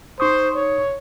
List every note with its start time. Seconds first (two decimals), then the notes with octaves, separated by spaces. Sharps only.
0.20 D#4 C5 C#6 D#6
0.56 C#5